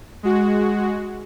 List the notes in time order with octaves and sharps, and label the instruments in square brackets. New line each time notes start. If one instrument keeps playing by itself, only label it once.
[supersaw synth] G#3 F#4